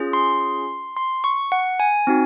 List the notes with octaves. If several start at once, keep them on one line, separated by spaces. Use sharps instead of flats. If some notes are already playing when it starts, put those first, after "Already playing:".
Already playing: C#4 F4 G#4
C6
C6
C#6
F#5
G#5
C4 D#4 F#4